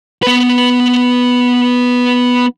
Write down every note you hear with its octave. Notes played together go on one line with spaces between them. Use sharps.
B3 B4